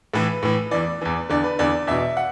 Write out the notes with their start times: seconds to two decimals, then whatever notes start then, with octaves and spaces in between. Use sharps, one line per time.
0.14 A2 E3 B4
0.43 A2 E3
0.71 E2 E3 D5
1.01 E2 E3
1.29 E2 D3 D5
1.44 B4
1.59 E2 D3 D5
1.87 E2 B2 E5
2.17 F#5